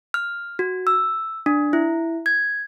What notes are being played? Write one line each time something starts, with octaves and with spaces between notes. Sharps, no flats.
F6
F#4
E6
D4
E4
G#6